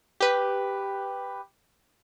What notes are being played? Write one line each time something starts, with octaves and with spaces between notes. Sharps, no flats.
G4 B4